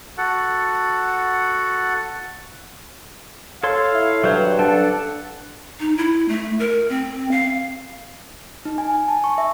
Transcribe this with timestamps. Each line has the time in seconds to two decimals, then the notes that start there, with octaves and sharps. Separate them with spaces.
0.18 F#4 A4 F#5
3.63 A4 C#5 F5 C6
3.93 E4
4.24 G2 F#3 C5
4.59 D4 A4 F#5 A5
5.80 D#4
5.97 E4
6.29 A3
6.60 A#4
6.89 C4
7.31 F5
8.65 D#4
8.78 G#5
8.94 G#5
9.08 A5
9.24 C#6
9.38 E5